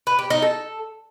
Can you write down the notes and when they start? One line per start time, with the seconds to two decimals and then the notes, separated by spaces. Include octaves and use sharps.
0.07 B4
0.19 G4
0.30 D#4
0.42 A4